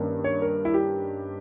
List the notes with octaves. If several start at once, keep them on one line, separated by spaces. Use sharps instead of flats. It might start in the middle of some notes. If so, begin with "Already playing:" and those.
Already playing: G2 D#3 A#3 C#4
C#5
A#4
E4
G4